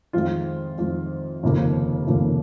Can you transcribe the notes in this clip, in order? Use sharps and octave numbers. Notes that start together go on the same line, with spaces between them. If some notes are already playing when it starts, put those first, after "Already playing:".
F2 D#3 G#3 F4
F2 D#3 G#3
F1 D#2 C#3 F3 A#3
F1 D#2 C#3 F3 A#3